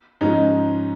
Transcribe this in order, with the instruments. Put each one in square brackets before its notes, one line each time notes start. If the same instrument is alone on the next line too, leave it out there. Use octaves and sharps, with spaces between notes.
[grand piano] G#2 F3 G#3 [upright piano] C#4 D#4